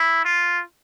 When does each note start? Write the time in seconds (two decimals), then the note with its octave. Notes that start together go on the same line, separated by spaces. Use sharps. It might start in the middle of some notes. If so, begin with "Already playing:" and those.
Already playing: E4
0.25 F4